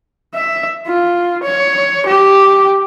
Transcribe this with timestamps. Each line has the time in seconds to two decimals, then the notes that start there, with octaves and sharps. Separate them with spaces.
0.35 E5
0.87 F4
1.43 C#5
2.06 G4